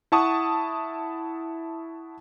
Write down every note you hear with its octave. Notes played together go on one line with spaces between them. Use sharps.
E4 F#5 A5 C#6 D#6